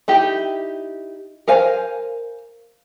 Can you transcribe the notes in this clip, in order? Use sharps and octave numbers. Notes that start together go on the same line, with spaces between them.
D#4 E4 G4
A#4 C5 F5 G#5